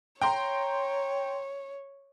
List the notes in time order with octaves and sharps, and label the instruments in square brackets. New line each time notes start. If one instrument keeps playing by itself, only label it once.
[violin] C#5 [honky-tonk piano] G5 A#5 C6